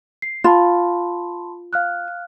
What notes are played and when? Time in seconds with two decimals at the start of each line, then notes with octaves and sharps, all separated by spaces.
0.22 C7
0.44 F4 A5 B5 C6
1.73 F5 F6 F#6